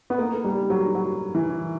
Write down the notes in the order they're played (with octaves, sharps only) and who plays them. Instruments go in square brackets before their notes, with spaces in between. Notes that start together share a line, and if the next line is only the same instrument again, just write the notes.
[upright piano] B3
A#3
A#3
G3
F#3
F#3
E3